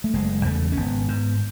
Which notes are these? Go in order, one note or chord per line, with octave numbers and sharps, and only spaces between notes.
A3
F#1 G#3
E2 C#3 A3
C#4
G#1 B3
G#2